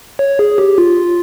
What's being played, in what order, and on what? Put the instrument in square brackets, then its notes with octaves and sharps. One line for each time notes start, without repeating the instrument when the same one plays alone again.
[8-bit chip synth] C#5
G#4
G4
F4